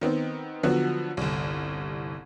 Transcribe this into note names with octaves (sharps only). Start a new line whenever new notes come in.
D#3 B3 C4
D3 F3 F#3 B3 F#4
G1 C2